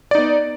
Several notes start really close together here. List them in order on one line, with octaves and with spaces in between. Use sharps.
D5 D#4 B3